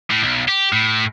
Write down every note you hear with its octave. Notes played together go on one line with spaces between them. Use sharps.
A2
B1
G4
A2